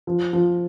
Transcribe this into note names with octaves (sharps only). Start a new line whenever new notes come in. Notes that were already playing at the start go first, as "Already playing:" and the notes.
F3
F3